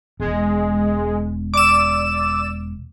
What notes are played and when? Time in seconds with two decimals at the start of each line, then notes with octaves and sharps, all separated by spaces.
0.20 E1 G#3
1.54 D5 D6 E6 E7